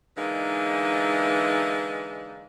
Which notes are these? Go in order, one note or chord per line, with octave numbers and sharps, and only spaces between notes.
D3 E3 G#3 A#3 D#4